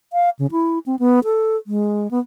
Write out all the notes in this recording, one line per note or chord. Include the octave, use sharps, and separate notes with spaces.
F5
C#3
E4
C4
B3
A4
G#3
B3